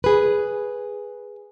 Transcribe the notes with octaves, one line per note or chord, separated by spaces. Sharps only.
G#4 B4